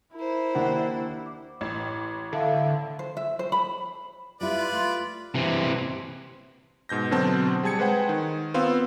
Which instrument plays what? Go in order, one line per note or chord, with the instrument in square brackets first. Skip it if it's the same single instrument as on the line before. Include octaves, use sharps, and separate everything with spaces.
[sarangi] E4 [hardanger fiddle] A#4 C5
[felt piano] D#2 D4 F#5
[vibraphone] D6
[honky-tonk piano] A1
[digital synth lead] D3 [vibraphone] A4 F5 A5 [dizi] E5
[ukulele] C5
E5
C5
B5
[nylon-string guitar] G3 E4 [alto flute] F4 [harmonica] B4 D5
[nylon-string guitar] A3
[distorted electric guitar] C3 E3
[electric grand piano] G#2 B2 G6 A#6
B2 D3 F#3 C4 A5
G3 G#4 A5 G#6 C#7
G#3 B4 C5 F#5 G5
D#3
B3 C4 F4 F5 E6